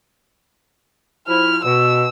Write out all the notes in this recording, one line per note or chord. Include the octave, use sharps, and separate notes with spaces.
F3 E4 F6
B2 E6